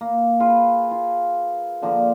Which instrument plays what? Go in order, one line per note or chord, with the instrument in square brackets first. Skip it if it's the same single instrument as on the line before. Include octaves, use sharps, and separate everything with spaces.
[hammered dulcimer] A#3
F4 G#4 B4
F4
A#2 D3 F3 A#3